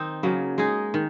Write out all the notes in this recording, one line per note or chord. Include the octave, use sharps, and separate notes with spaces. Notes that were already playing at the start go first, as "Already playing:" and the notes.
Already playing: D#3 C4 D#4
C#3 F#3 A#3
G#3 D#4 G#4
D#3